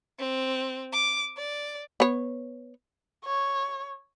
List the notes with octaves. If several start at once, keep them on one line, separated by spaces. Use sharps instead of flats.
C4
D6
D5
B3 C#5
C#5